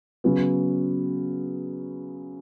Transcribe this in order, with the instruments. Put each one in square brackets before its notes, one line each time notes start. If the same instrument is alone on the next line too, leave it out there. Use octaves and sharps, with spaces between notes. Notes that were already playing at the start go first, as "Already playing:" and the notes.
[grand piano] C#3 F#3 B3